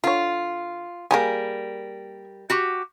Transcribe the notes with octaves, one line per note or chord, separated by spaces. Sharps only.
D3 F4 C#5
G3 A#3 G#4 A#4 G#5
F#4 G4